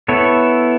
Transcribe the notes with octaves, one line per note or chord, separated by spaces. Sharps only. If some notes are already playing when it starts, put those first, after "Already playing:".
B3 E4 A4 C#5